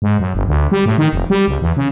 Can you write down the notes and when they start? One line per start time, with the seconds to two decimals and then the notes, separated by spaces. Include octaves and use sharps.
0.02 G#2
0.20 F#2
0.35 G1
0.48 D2
0.72 G3
0.86 A2
0.98 D#3
1.13 F1
1.30 G3
1.48 C#2
1.61 E2
1.77 C#3